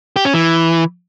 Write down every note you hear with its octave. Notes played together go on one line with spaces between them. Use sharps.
G4
C#4
E3